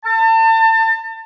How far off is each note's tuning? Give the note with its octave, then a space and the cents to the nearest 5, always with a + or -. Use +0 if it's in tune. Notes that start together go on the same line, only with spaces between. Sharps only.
A5 +35